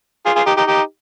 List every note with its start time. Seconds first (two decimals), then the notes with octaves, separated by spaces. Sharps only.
0.26 F4 G#4
0.36 F4 G#4
0.47 D#4 G4
0.57 D#4 G4
0.68 D#4 G4